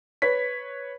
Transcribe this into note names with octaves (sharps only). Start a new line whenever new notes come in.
B4 C#5 B6